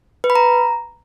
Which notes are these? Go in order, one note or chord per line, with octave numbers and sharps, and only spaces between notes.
B4
B5
A#5